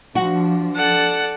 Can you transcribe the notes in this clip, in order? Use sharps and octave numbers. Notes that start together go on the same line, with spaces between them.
F3 D4 F#4
A4 D5 F#5